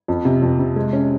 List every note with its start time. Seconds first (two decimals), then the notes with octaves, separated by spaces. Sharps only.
0.08 F2
0.25 C3
0.42 F2
0.59 C3
0.76 G#3
0.93 C#4